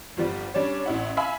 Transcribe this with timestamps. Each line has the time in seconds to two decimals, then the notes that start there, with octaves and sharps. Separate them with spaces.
0.17 G1 F3 G3 C4
0.54 G3 C#4 D4 C#5
0.86 A1 E4 F#5
1.17 E5 F5 G#5 B5 E6